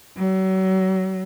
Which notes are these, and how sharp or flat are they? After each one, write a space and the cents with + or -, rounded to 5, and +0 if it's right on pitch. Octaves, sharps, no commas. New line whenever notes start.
F#3 +35